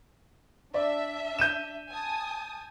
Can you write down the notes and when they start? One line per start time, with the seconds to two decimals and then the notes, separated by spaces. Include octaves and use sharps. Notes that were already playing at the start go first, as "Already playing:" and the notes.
0.74 D4 D5 E5
1.39 G6 D#7 E7
1.90 G#5 A5 D#6